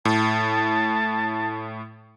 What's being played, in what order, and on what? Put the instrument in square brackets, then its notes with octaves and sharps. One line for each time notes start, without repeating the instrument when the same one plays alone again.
[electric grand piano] A2 [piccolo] A5